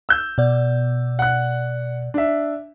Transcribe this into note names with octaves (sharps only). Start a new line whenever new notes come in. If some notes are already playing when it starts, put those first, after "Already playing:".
E6 G6
B2 D5
F#5 F#6
D4 E5